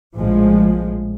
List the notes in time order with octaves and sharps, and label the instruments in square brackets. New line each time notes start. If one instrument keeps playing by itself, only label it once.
[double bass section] A#1 A2 F3 G#3